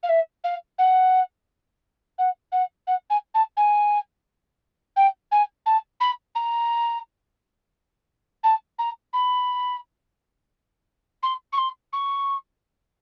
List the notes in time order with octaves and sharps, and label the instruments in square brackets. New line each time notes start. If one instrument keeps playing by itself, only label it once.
[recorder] F5
E5
F5
F#5
F#5
F#5
F#5
G#5
A5
G#5
G5
G#5
A5
B5
A#5
A5
A#5
B5
C6
C#6
C6
C#6